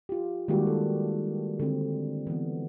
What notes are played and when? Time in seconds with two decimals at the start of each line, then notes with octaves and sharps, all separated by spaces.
0.09 F4 G4
0.48 D#3 G3 G#3 A#3 F#4 G4
0.67 A4
1.60 D3 C4
2.27 E3 B3